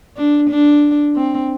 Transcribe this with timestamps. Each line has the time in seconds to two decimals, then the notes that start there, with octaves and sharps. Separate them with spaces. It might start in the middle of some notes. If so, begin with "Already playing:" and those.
0.17 D4
0.50 D4
1.16 C4